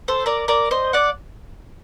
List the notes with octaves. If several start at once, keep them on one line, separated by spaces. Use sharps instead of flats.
A4 C5
A#4 D5
A#4 D5
C5 D#5
D5 F#5